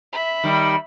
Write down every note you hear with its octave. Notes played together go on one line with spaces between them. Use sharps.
E5 B5
D#3 G3